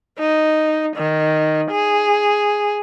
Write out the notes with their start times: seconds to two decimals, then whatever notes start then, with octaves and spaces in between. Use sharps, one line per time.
0.19 D#4
0.96 D#3
1.71 G#4